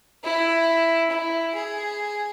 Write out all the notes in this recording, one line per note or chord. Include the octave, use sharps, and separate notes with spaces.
E4
E4
G#4